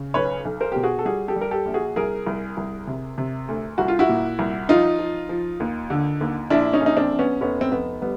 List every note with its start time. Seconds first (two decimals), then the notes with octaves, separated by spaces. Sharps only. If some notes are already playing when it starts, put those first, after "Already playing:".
Already playing: C#3
0.14 B1 B4 C#5
0.45 B1
0.61 A#4 C5
0.72 B2 G4
0.83 F#4 G#4
0.99 A4
1.05 G3 F#4 G#4
1.28 G4 A4
1.36 G3
1.41 A#4
1.51 G4 A4
1.66 A#1
1.74 F#4 G#4
1.96 C2 G#4 A#4
2.26 C2
2.57 C2
2.87 C3
3.18 C3
3.48 D2
3.78 C2 F#4
3.88 F4
3.99 E4 F#4
4.09 A#2
4.39 C2
4.69 F3 D#4 F4
4.99 F3
5.29 F3
5.60 D#2
5.90 D3
6.21 D#2
6.50 A#1 D4 E4
6.73 C#4 D#4
6.81 A#1
6.86 D#4
6.97 C4 D4
7.11 A#1
7.19 B3 C#4
7.41 F1 B3 C#4
7.61 C4
7.72 F1 B3
8.02 G3 B3